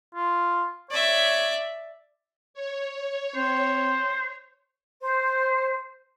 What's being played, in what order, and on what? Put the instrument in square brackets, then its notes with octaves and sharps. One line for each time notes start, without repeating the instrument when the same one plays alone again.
[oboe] F4
[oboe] C#5 [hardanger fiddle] D5 E5
[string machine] C#5
[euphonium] C4 [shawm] C5
[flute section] C5